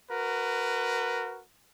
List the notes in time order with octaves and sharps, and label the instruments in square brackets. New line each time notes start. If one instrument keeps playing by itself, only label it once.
[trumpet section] F#4 A#4 B4